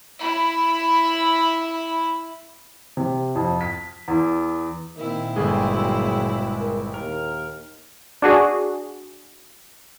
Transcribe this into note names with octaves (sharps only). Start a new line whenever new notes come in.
E4 B5
C3
F2
B6
E2
A#2 D#3 C4 E4
G1 G#3 A3 G#4
F#3
A#4
D#2 A#4
D4 F#4 G#4